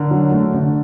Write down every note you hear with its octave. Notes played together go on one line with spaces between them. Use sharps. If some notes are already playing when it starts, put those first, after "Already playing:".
Already playing: D3 A#4
F#3
A3
D3